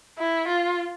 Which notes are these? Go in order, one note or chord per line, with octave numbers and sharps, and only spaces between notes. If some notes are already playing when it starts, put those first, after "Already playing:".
E4
F4